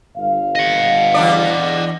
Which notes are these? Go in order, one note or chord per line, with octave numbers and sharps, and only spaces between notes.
G1 F5
D#5 F#5
E2 D4 D5